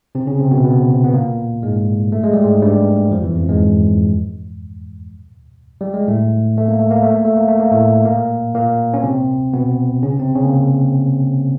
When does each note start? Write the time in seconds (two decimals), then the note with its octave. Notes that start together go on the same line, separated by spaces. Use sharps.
0.15 C3 C4
0.27 C#3 C#4
0.39 C3 C4
0.51 B2 B3
0.64 B2 B3
1.04 B3
1.13 A#2 A#3
1.63 G#2 G#3
2.12 A3
2.24 G#3
2.33 G3
2.44 G#2 G#3
2.62 G2 G3
3.11 F2 F3
3.24 E2 E3
3.35 F2 F3
3.48 G#2 G#3
5.81 G3
5.94 G#3
6.08 A2 A3
6.58 A3
6.68 A#3
6.80 A3
6.91 A#3
7.03 A3
7.14 A#3
7.25 A3
7.37 A#3
7.48 A3
7.60 A#3
7.71 A2 A3
8.05 A#2 A#3
8.54 A#2 A#3
8.94 C#4
9.04 C3 C4
9.53 B2 B3
10.02 C#3 C#4
10.19 C3 C4
10.35 C#3 C#4
10.45 A#3